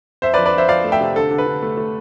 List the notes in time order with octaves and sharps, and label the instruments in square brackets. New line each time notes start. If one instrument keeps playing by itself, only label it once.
[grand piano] F2 C5 E5
B4 D5
F3
B4 D5
F3 C5 E5
F3 D5 F5
A3
E5 G5
C3
D3 A4
D3
B4
D3
A3
A3